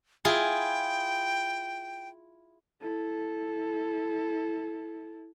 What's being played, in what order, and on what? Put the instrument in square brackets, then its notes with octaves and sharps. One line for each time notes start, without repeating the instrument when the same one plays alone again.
[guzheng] E4 F4 G#4 [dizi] G5
[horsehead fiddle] E4 A4